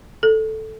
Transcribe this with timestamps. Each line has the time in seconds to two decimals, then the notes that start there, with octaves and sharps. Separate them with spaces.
0.23 A4